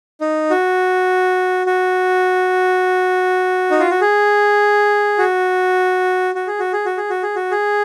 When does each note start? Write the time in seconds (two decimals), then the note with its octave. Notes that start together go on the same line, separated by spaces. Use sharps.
0.21 D#4
0.50 F#4
1.67 F#4
3.71 D#4
3.80 F4
3.90 F#4
4.01 G#4
5.18 F#4
6.35 F#4
6.47 G#4
6.59 F#4
6.73 G#4
6.86 F#4
6.97 G#4
7.10 F#4
7.23 G#4
7.36 F#4
7.51 G#4